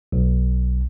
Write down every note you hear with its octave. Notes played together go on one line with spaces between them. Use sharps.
B1